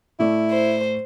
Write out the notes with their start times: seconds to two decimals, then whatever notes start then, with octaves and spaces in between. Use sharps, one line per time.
0.19 A2 A3 E4 D5
0.51 C5